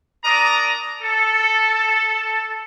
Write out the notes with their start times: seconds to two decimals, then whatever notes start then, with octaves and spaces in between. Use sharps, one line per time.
0.23 D4 A#4 D5 A#5 D#6
1.01 A4